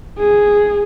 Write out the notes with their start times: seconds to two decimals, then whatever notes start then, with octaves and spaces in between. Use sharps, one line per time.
0.18 G#4